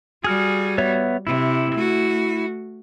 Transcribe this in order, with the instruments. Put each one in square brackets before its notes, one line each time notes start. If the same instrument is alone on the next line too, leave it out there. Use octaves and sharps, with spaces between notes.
[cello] G3 F#4 [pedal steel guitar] G#4 F6
[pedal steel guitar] B3 C#5 E5
[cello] C3 [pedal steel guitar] E4
[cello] A3 F#4